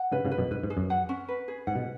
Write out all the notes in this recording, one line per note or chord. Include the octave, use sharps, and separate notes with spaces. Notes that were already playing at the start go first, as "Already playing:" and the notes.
Already playing: F#5
G#2 C#3 B4
G#2 C#3
B4
F#2 B2
G#2 B4
G#2
G#4
F#2
F#5
C#4
B4
G#4
G#2 F#5
B2